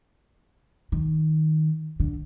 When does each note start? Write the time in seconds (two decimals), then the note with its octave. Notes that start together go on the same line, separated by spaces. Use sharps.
0.92 D#3
2.00 D3